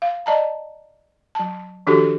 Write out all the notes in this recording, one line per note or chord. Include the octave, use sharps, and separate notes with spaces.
F5
D5 D#5 A5 A#5
F#3 A5
D#3 F3 D4 F#4 G4 A4